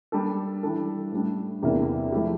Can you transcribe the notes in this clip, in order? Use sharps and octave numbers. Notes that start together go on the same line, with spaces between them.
G3 A#3 D4 A4
E3 G3 D4 A4
A2 G3 D4
E2 C3 E3 A#3 D4
F3 A3 E4 G4